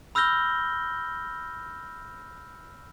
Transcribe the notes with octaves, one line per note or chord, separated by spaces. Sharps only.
B5 E6 F6 G6 A#6 G7